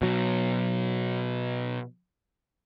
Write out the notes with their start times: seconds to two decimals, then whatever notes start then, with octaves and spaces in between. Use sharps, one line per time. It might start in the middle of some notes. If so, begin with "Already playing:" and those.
0.02 B2 F#3